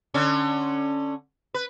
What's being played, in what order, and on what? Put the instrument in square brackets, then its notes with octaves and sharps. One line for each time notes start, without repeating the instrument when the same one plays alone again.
[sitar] D3 C#4
B4